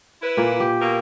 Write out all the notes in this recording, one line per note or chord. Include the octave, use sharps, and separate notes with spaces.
E4 B4
A#2 A#3
G4
B2 A#3 A#4